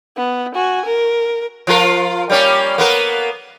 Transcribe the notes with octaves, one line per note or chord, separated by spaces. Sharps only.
B3
F#4 G#5
A#4
F3 F4 A#4
G3 A#3 C#4
A#3 B3 A#4